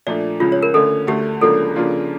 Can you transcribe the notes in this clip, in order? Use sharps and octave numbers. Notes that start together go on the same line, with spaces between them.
A#2 F3 A3 D4 D5
C#2 C#3 F3 F4
C#5
A#4
D3 A3 C#4 A4
D2 D3 A3 G4
C#2 C#3 F3 A#3 D4 A4
C#3 F3 A#3 D4 F4